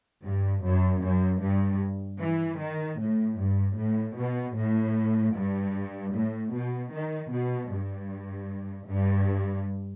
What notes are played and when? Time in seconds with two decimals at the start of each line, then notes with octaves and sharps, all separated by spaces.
0.24 G2
0.64 F#2
1.02 F#2
1.41 G2
2.20 E3
2.60 D#3
2.99 A2
3.39 G2
3.77 A2
4.17 B2
4.56 A2
5.35 G2
6.14 A2
6.54 B2
6.93 D#3
7.31 B2
7.71 G2
8.88 G2